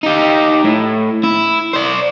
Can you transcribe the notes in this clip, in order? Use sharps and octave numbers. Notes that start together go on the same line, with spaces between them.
D#4 G4
A2
E4
C5 D5